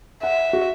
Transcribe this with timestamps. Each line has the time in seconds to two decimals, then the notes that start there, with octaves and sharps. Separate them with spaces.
0.23 E5 F#5
0.53 F#4